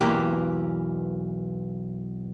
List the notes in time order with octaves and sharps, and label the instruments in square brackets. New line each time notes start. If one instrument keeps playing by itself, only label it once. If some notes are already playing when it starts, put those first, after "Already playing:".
[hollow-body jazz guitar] B1 E2 E3 A#3 G4 B4